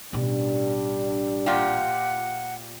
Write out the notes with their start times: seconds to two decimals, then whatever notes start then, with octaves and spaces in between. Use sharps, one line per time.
0.13 A1 B2 G3 D4
1.46 A#2 F4 G4 F#5